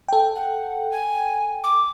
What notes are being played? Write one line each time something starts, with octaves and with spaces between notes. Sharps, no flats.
A4 G5
F#5
G#5
D6